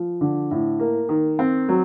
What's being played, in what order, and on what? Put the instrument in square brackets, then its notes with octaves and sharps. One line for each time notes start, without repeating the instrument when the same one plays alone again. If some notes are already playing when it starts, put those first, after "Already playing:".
Already playing: [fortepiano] F3
D3
A2
A#3
D#3
C4
F#3